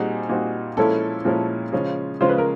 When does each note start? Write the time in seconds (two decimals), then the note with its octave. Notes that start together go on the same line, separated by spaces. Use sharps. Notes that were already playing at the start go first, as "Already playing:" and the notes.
Already playing: A#2 G3 C4 D#4 F#4 G#4
0.29 A#2 G3 C4 D#4 F#4
0.77 A#2 F3 G#3 C#4 E4 A4
1.25 A#2 F3 G#3 C#4 E4
1.73 C#3 F3 G#3 C#4 F4
2.20 C#3 F3 G#3 C#4 F4 C5
2.29 B4
2.38 A#4